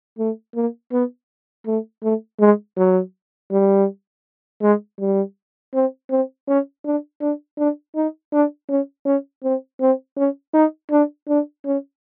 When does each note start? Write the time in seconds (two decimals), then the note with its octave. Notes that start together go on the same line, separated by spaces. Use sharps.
0.19 A3
0.55 A#3
0.92 B3
1.67 A3
2.03 A3
2.40 G#3
2.77 F#3
3.51 G3
4.62 G#3
4.99 G3
5.74 C4
6.10 C4
6.48 C#4
6.85 D4
7.21 D4
7.58 D4
7.96 D#4
8.33 D4
8.69 C#4
9.05 C#4
9.43 C4
9.81 C4
10.17 C#4
10.54 D#4
10.91 D4
11.28 D4
11.65 C#4